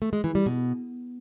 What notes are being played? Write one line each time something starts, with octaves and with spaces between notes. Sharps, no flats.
A3
G#3
E3
G3
B2